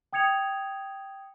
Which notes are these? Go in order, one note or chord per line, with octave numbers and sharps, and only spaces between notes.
G5 D#6 G#6 C#7 F7